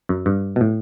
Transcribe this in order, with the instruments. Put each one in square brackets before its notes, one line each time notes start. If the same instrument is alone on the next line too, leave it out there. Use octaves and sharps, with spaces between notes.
[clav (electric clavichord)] F#2
G2
B2
A2